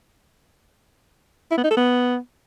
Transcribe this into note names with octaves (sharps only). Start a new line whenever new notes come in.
E4
B3
D#4
A4
B3